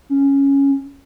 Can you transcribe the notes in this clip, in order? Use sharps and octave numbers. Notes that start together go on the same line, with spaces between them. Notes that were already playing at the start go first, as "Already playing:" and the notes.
C#4